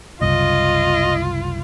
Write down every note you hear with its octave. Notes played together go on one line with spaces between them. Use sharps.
F#1 C2 F4 D#5